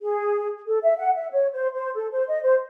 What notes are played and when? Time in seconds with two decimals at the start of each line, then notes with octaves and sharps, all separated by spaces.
0.02 G#4
0.67 A4
0.83 E5
0.99 F#5
1.15 E5
1.32 C#5
1.53 C5
1.74 C5
1.95 A4
2.12 C5
2.28 D#5
2.43 C5